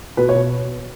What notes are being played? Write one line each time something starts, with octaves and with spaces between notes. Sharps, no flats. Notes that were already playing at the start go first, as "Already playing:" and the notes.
B2 B4
C#5
B2